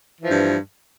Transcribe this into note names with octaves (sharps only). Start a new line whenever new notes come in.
G2 E3 F3